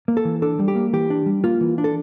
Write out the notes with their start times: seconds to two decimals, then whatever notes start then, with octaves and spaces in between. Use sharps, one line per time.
0.08 A#3
0.17 A4
0.25 E3
0.42 D4 A4
0.59 G3
0.68 G4
0.75 A#3
0.93 E3 G4
1.10 D4
1.26 G3
1.44 A#3 F4
1.61 E3
1.78 D4
1.84 A4